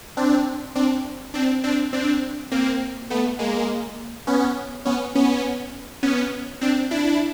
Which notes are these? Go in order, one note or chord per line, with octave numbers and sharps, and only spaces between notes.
C4 D4
C4 D4
C4 D4
C4 D4
C4 D4
A#3 C4
A3 B3
G#3 A#3
B3 C#4
B3 C#4
B3 C#4
B3 C#4
C4 D4
D4 E4